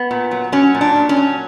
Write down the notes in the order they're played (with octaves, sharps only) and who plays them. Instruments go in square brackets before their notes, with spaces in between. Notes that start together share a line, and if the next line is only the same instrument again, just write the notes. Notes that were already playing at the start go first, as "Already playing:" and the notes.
Already playing: [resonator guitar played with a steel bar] B3
A#2
F#3
F#3 C#4
A#2
D4
A#2
C#4
F#3